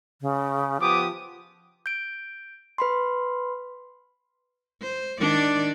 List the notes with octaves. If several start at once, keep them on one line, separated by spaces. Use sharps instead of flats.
C#3
F3 B3 G4 D6 D#6
G6 D7
B4 B5 C6
C5
D#3 D4 D5